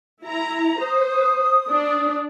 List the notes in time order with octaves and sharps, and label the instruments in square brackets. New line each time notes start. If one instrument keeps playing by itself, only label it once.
[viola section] E4 A#5
[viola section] C5 [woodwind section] D#6
[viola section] D4